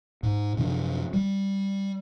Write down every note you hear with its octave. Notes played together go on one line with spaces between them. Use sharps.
G#2
F#2 C3 F3 D4
G3